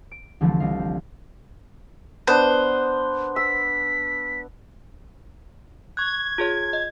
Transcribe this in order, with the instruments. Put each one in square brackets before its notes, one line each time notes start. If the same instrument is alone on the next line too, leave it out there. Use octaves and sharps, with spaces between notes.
[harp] D7
C2 D3 E3 F3 G3 A3
C2 D#5 F5
C4 A#4
[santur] B3 D4 [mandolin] C5
[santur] E6 [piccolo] B6
[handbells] C#6 F#6 [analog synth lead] G#6
[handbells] F4 G#4 C#5
D#5